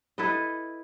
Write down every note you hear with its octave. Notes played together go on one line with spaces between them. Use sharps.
E4 A4 B4 D#5